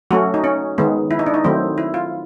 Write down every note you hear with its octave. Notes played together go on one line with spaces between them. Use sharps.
F#3 A3 C#4 F#4
D#4
C#4
D#3 G#3 B3
E4
D#4
D4
D#4
D#3 F#3 A3 C4
E4
F4